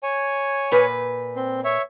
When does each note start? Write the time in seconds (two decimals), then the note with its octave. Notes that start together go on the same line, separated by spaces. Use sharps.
0.03 C#5 G#5
0.71 A#2 B4
1.36 C4
1.64 C#5 E5